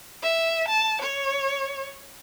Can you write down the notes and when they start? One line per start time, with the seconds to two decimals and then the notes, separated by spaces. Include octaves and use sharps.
0.23 E5
0.68 A5
1.02 C#5